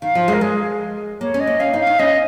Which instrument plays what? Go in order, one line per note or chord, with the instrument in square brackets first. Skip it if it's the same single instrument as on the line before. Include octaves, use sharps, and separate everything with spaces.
[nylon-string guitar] D#3 [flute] F5
[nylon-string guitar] F3
G#3
[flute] A#4
[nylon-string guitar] G#3 [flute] G#4
[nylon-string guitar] A#3 [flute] C#5
[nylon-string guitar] C#4
[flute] D#5
[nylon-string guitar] A#3
[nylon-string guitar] C#4 [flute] F5
[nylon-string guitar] D#4
[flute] F5
[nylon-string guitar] D#4
[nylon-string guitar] C#4 [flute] D#5